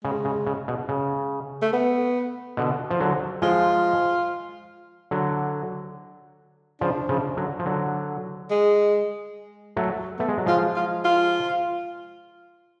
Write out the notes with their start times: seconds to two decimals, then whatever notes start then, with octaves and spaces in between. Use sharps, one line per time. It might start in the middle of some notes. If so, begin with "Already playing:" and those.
0.04 C#3 G#3
0.25 C#3
0.46 C#3
0.68 B2
0.89 C#3
1.62 A3
1.73 B3
2.57 B2 D3
2.91 F3
3.00 D3 F#3
3.42 F3 G#3 F4
5.11 D3 F#3
6.81 C#3 F3 D4
7.09 C#3 F3
7.37 D3 F#3
7.59 F3
7.66 D3 F#3
8.51 G#3
9.77 F#3 A3
10.19 A3 B3
10.28 G#3
10.38 F#3
10.46 F3 G#3 F4
10.76 F4
11.05 F4